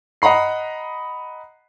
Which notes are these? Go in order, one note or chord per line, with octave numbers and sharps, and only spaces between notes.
D#5 F#5 A#5 B5 C7